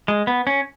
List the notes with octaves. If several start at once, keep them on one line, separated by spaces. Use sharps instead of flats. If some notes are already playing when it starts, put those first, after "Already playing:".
G#3
B3
C#4